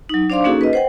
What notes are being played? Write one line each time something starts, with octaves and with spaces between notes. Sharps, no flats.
F#3 D#4
D4 C5 D5 F5 C6 D6
A#3 C#4 D#4 F#4 G#4 A4
B4 D#5
C5 F#5 G5